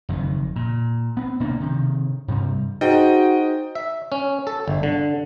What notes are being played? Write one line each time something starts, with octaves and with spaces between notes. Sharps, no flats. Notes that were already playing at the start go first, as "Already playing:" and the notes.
F#1 F2 D#3
A#2
B3 C4
D1 B2 A#3 D4
C3 D#3
G2 C3 G3
D#4 F#4 G#4 C5 D#5 G5
E5
C#4
A4
G1
D3